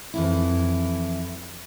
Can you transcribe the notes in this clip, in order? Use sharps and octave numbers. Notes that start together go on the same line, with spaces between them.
F2 E3 E4